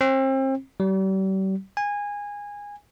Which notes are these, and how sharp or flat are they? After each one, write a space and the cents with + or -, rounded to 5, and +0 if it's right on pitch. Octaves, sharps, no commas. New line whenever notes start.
C4 +35
G3 -40
G#5 -20